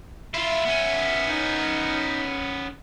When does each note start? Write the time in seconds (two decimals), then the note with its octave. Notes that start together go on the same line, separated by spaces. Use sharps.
0.34 E4 F4 E5
0.65 B3 C#4
1.27 D#4